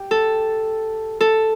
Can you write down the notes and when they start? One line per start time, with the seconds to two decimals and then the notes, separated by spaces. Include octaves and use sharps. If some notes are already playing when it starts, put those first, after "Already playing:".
Already playing: G4
0.11 A4
1.21 A4